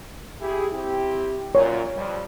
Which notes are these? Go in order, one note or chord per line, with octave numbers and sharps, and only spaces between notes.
E4 G4 G#4
C4 E4 G4
F#2 A#2 C#5
F2 G3